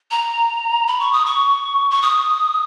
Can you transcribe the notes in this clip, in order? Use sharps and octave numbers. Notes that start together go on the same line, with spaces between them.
A#5
B5
C#6
D#6
C#6
C#6
D#6